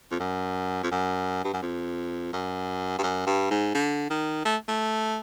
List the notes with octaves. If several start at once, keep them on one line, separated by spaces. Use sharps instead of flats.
F2
F#2
F2
F#2
G2
F#2
F2
F#2
G2
F#2
G2
G#2
D3
D#3
A3
A3